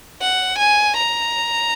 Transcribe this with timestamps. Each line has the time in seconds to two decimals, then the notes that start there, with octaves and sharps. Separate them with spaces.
0.22 F#5
0.58 G#5
0.97 A#5